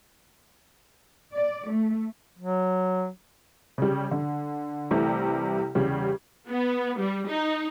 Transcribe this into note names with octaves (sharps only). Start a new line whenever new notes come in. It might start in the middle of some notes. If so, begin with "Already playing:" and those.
D5
A3
F#3
C#3 G3
D3
C2 C3 E3 G3 A3
E2 C#3 G3
B3
G3
D#4